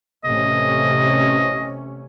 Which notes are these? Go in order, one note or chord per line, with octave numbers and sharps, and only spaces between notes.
A1 C3 C#4 D#5